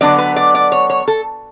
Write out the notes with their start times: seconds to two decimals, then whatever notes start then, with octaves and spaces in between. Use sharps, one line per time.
0.01 D3 F#3 B3 D4 D5
0.18 B4
0.36 D5
0.55 D5
0.72 C#5
0.90 C#5
1.08 A4